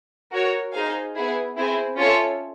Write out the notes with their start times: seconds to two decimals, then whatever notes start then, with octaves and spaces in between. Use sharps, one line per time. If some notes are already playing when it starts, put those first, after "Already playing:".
0.32 F#4 A#4 C#5
0.73 D#4 G#4 C5 F5 G#5
1.15 B3 E4 G#4
1.56 C4 E4 G#4 C5
1.97 C#4 F4 A4 C#5 E5